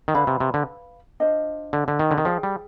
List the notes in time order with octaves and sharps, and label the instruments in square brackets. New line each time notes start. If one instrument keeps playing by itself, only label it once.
[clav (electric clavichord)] D#3
[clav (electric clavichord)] D3 [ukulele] B4 D5 F5 B5
[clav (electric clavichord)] C3
C3
D3
[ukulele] D4 F4 C5 D#5
[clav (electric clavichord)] D3
D3
D#3
D3
D#3
[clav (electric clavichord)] F3 [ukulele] G#4 D5 G5
[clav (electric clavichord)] G3